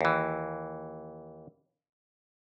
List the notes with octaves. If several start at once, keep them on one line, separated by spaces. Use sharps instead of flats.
D#2 E3